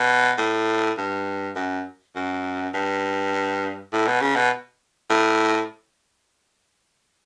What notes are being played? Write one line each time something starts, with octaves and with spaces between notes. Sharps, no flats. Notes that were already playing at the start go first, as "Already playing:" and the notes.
Already playing: B2
A2
G2
F#2
F#2
G2
A2
B2
C#3
B2
A2